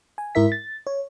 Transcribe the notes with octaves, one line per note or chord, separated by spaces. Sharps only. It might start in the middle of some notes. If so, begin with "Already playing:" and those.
G#5
G#2 E4 A#4 E5 B6
A6
C#5